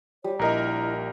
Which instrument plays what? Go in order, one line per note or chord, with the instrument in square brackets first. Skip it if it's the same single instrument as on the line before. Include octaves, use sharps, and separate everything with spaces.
[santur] G3 [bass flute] C#5
[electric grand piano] A#1 A#4 [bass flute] E4 [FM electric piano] D#5 A#5